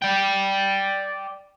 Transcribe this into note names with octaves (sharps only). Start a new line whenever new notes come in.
D5 G5